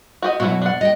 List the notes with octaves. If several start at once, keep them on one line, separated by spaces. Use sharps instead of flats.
F#4 G4 D#5
F#2 B2 F#3 E4 F#4
D4 F#5
D#5 G5